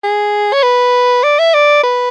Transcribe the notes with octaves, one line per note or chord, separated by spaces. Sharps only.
G#4
C#5
B4
D5
E5
D5
B4